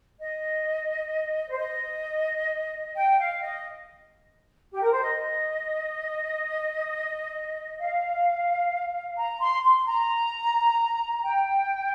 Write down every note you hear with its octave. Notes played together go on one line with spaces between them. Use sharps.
D#5
C5
D#5
G5
F5
D#5
G4
A#4
C5
D#5
F5
A#5
C6
C6
A#5
G5